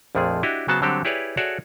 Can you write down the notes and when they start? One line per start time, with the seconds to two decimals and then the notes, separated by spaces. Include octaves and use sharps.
0.15 A#1 F2 F3 A3 G#4
0.43 D4 E4 F#4 G4 D#5
0.68 C#3 F#3 B3 F#4 C5 A5
0.82 D3 F#3 G3 C4 G4 A4
1.05 E4 G4 G#4 B4 C#5 D5
1.37 F#4 G#4 A4 C#5 D5 E5